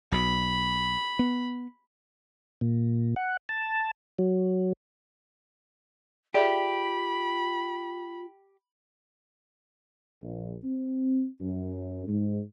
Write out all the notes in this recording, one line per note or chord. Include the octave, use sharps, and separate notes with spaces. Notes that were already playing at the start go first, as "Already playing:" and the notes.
B1 B2 B5
B3
A#2
F#5
A5
F#3
F4 G4 G#4 D5 E5 B5
A#1
C4
F#2
G#2